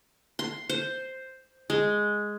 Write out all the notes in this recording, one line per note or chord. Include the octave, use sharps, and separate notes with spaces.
C6
C5
G#3